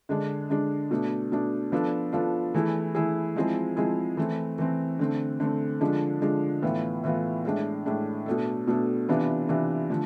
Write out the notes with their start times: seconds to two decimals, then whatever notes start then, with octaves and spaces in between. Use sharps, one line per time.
0.09 D3 G#3 D4
0.50 D3 G#3 D4
0.91 B2 A3 D4
1.32 B2 A3 D4
1.72 F3 B3 D4 F4 A4
2.13 F3 B3 D4 F4 A4
2.54 E3 A3 E4 G#4
2.95 E3 A3 E4 G#4
3.36 F3 G#3 C4 E4 G#4
3.76 F3 G#3 C4 E4 G#4
4.17 E3 A3 C4
4.59 E3 A3 C4
4.99 D3 A3 C4
5.40 D3 A3 C4
5.81 D3 F3 G#3 D4
6.21 D3 F3 G#3 D4
6.62 A2 E3 B3 F4
7.03 A2 E3 B3 F4
7.45 A2 G#3 D4
7.86 A2 G#3 D4
8.26 B2 A3 D4 A4
8.67 B2 A3 D4 A4
9.08 C3 E3 B3 D4 F4
9.49 C3 E3 B3 D4 F4
9.90 D3 F3 A3